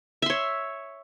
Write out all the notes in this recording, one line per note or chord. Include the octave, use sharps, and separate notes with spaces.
C#5 E5 C6